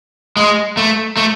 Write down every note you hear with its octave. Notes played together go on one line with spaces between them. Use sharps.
G#3
A3
A3